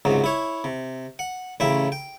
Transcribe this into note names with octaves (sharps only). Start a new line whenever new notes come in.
C#2 G#2 C3 F#3
E4 C#5
C3
F#5
A1 C#3 E4 E5 G5
G5